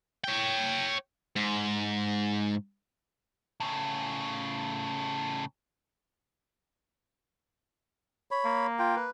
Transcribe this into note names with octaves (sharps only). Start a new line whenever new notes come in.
C#5 G5
G#2
A2 C#3
C#5 B5
A#3
F4 G5
B4